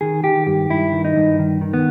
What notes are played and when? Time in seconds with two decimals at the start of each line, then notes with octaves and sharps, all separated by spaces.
0.01 D#3 G#4
0.24 D#3 G4
0.47 G2 G4
0.70 G2 E4
0.92 D#3
1.05 D#4
1.16 G2
1.39 D#3
1.61 D#3
1.73 B3